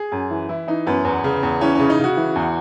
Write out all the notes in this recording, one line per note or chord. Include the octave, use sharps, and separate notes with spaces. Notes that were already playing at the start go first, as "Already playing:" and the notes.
Already playing: G#4
F#2
E3
E3 E4
E3 D#4
F#2 B3
E2 B3
C#3
E2
E3 C#4
C#3 C#4
D#4
C#3 F#4
E3
E2